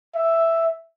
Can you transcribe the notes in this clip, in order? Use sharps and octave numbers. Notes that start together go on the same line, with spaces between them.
E5